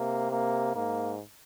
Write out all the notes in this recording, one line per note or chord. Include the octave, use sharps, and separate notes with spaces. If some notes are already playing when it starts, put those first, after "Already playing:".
Already playing: C3 A#3
A#3
G#2 A#3